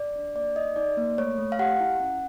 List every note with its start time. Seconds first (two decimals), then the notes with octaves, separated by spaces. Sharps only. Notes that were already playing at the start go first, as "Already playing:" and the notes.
Already playing: D5
0.15 D4
0.35 A#3 D5
0.55 D#4 D#5
0.76 D#4 D5
0.97 A#3
1.18 A3 C#5
1.38 A3
1.52 F5
1.59 G4 F#5
1.80 E4
2.00 C#4